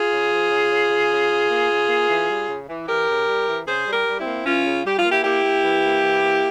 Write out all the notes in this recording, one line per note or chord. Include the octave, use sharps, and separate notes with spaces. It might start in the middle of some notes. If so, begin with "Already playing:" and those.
Already playing: F4 G#4
C#3
F3
C#3
C#3
C#3
C#3
C#3
A#3
C#3
A#3
E3
G3
C#3
E3
E3 G4 A#4
C#3
G3
E3
C#3 G#4 C5
G3
G4 A#4
G3
C4 E4
A#3
E3 C#4 F4
C#3
G3 G4
F4
A#3
E4 G4
A#3 E4 G4
A#3
E3
A#3
E3
A#3